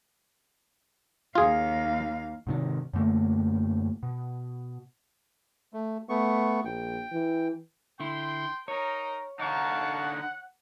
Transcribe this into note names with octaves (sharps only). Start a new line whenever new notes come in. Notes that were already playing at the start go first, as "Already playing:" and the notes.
D#2 F4 G#4 F5
G#2 C3 D#3
F#2 D3 A3 A#3
B2
A3
A3 B3 C#6
A#1 G5
E3
D3 E4 G5 C6
D#4 A#4 C#5 A#5
D3 D#4 F5 F#5 A5 C#6